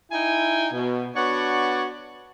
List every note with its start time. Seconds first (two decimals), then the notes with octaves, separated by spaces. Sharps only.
0.12 D#4 E4 G5 G#5
0.73 B2
1.16 B3 D4 F#4 C#5 D5 F#5